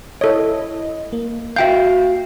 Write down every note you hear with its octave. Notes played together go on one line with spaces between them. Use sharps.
E4 A4 C#5 D#5
A#3
F#4 E5 F5 G5 G6